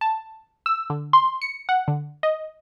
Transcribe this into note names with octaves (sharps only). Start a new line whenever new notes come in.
A5
E6
D3
C6
C#7
F#5
D3
D#5